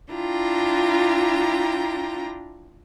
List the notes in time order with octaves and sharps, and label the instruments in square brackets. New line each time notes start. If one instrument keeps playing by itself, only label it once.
[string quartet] D4 E4 F4 G5 A#5